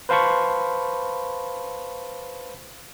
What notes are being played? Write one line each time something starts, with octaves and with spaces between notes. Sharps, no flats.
B4 C5 F5 A5 B5 C#6